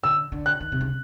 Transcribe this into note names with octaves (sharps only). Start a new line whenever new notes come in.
D3 E6
D3
F#6
D#3
C3
C#3